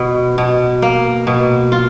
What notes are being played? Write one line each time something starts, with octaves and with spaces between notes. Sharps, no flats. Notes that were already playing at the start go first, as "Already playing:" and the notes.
Already playing: B2
B2
A#3
B2
F4